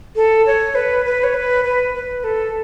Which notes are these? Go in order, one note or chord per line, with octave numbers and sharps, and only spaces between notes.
A4
C#5
B4
B4
C#5
B4
B4
B4
A4